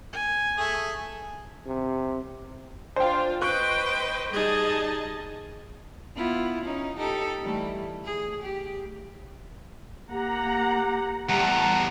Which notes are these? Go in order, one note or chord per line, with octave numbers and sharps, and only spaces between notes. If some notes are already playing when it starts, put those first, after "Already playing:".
G#5
A3 G#4
C3
D4 F4 C5 F5 G5
B4 C5 D#5 G5 C#6 F#6
G3 D#4 G#4 D#5 A5
B3 E4 F4
C#4 D#4
D#4 G4 A4
E3 G3 A3
G#4
G4
A#3 G4 F#5 A#5
E2 A2 G3 F#5 A5 A#5